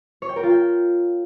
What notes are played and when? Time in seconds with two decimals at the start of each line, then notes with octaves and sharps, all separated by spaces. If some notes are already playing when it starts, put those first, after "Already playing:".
0.22 C#5
0.29 G5
0.36 A#4
0.43 F4
0.50 G5